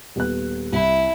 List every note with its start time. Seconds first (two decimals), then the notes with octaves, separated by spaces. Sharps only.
0.16 D#1 B3 F#6
0.72 C2 E4